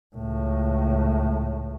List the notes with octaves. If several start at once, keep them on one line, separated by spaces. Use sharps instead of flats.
C#2 A2